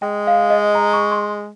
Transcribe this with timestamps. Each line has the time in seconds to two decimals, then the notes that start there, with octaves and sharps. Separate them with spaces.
0.02 G#3 G5
0.27 F5
0.50 D#5
0.75 A#5
0.93 C#6
1.12 C6